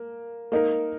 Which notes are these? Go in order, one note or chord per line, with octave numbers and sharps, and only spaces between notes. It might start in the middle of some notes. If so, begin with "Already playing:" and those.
Already playing: A#3
A#3 D#4 A#4